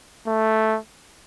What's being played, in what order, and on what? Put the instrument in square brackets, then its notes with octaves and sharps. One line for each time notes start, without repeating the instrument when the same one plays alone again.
[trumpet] A3